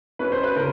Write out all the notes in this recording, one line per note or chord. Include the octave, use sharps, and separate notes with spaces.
C#4 B4
C5
B4
C#3 A#4